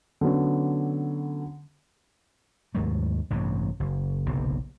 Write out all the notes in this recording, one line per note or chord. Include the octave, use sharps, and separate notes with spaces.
D3 F#3 B3 C#4
D#2 G#2 F#3 A3
A1 G2 C3
F#1
F#1 B1 C3